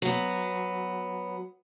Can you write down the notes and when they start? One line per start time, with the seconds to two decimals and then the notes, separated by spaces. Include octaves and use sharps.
0.02 F#3 B3